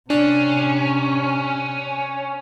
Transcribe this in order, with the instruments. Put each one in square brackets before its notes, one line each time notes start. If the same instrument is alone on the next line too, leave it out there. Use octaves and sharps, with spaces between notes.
[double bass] C3 [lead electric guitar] C#4 [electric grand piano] D4